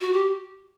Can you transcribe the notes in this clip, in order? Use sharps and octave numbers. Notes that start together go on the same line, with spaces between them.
F#4
G4